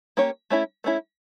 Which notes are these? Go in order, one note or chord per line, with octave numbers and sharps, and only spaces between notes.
A#3 C#4 G4 C#5
A3 C#4 E4
A3 C#4 E4